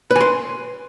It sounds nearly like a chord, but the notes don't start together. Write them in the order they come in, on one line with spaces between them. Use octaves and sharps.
B4 G#5 C6